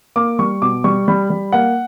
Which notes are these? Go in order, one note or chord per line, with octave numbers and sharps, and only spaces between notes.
A#3 D6
G3 C#6
B2 D6
G3 C#6
G3 B5
G3
A#3 F#5